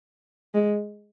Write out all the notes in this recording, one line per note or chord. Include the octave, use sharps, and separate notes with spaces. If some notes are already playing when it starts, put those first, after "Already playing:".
G#3